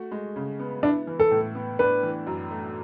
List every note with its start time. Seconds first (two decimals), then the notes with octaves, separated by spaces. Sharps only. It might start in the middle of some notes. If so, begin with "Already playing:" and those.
Already playing: A3 F#4
0.11 G#3
0.36 C#3
0.60 B3
0.83 D4 E4
1.07 E3
1.20 A4
1.31 A2
1.55 B3
1.79 D4 B4
2.03 E3
2.27 F#2
2.51 A3